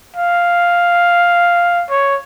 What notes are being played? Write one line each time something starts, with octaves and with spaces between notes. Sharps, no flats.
F5
C#5